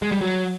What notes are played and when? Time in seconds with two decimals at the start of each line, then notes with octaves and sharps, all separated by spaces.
0.02 G#3
0.12 G3
0.21 F#3